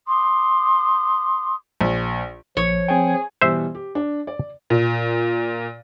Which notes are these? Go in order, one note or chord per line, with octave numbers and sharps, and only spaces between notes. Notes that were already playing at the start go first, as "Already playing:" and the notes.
C6 D6 D#6
A#1
A#1 F3 C#5
C4 G#4 G5
B2 E3 G3 C5 E5
G4
D4
D5
A#2